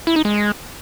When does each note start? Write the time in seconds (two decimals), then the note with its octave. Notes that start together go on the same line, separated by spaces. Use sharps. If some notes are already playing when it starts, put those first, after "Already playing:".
0.07 E4
0.16 D#4
0.25 G#3